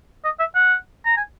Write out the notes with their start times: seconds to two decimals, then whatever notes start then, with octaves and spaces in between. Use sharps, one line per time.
0.24 D#5
0.39 E5
0.55 F#5
1.05 A#5
1.17 G#5